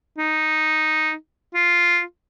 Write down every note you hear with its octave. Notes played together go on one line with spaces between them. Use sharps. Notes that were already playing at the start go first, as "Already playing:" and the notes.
D#4
F4